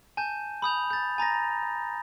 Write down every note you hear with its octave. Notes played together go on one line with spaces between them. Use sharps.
G#5 A5 G6
B5 D#6 G6 F7
G6 A6
G#5 A#5 A6 A#6